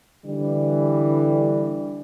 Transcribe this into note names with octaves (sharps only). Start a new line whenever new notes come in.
D3 E3 G3